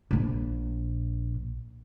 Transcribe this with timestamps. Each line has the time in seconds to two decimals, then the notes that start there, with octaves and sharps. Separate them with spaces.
0.11 A#1 A#2